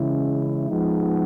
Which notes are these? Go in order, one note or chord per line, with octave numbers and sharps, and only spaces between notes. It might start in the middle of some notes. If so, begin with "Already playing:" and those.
Already playing: C#3 E3 G#3 C#4 E4
F3 G#3 B3 D#4